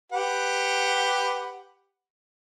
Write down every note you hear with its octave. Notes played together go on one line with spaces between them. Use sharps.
G4 B4 F#5